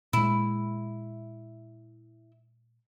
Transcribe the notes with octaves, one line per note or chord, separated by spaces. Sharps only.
A#2 G#3 E4